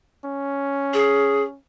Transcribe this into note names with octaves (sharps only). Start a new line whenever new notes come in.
C#4
G#4